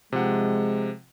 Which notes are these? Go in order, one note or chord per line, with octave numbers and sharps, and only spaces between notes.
C3 F3 G#3 F#5